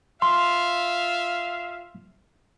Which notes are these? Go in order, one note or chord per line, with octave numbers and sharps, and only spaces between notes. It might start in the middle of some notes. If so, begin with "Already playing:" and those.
F4 E5 F5 C6